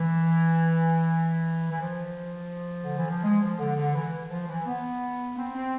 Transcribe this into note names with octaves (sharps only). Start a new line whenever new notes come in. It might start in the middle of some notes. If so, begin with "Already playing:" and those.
Already playing: E3
E3
F3
D3
E3
F3
G#3
F3
D3
D3
E3
F3
E3
B3
C4
C4